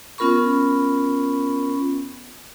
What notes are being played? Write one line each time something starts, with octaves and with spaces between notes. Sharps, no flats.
B3 C#4 F4 A#4 B5 C#6